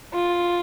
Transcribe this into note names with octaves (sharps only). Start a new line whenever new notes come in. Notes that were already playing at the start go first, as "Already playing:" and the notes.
F4